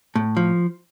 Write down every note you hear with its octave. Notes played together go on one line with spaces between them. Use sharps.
A2
F3